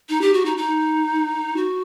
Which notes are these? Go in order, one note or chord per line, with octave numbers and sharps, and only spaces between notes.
D#4
G4
F#4
D#4
D#4
F#4